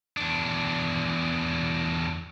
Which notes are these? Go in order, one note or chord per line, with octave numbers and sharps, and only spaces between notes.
E2 D4